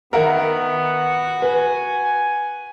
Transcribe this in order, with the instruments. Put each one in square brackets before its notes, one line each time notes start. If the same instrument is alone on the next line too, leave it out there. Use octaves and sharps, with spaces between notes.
[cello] D#3 [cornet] B3 [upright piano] A#4 E5 F#5
[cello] F#4
[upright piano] B4 [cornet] G#5